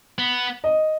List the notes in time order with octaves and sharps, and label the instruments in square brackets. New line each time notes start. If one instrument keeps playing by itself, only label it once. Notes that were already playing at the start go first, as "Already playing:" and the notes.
[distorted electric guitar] B3
[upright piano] D#5